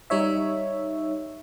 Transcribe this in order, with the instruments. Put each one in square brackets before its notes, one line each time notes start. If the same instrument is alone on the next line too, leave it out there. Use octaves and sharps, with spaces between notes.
[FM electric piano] G3 D#4 C#5 E5